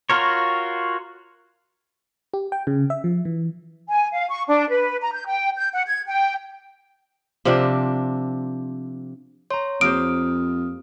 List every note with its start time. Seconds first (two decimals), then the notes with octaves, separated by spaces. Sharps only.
0.10 F4 F#4 A#4 C#5
2.34 G4
2.52 G5
2.67 C#3
2.90 E5
3.04 F3
3.25 E3
3.89 G#5
4.13 F5
4.28 C#6
4.48 D4
4.70 B4
5.01 A#5
5.14 G6
5.25 G5
5.56 G6
5.73 F#5
5.87 G#6
6.07 G5
7.45 C3 F3 C4 D4
9.50 C#5 A#5 C6
9.81 F2 A#3 G4 C5 D#6 F6 D7